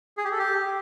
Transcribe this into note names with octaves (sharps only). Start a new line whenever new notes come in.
G#4
G4
A4
G4